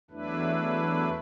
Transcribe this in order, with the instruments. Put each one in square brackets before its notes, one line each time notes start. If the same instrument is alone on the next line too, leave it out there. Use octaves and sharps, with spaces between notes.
[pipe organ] E2 F#3 A3 D4 E4 B4